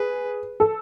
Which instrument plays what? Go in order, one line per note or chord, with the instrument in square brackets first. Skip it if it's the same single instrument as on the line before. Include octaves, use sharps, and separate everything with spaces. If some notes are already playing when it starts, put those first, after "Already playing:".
Already playing: [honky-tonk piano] G#4 [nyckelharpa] B4
[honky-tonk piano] A4